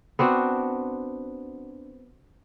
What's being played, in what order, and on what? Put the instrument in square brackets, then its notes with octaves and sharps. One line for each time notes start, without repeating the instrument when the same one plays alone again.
[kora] B3 C4 D4 F#4